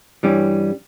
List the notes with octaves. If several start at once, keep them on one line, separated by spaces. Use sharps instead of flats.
G2 E3 G3 C#4